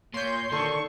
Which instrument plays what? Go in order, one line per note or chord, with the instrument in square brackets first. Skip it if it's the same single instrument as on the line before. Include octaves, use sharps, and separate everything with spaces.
[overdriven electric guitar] A#2 [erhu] C#5 [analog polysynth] C6 G6
[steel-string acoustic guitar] D3 A4 [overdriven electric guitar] D#3 [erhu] C#6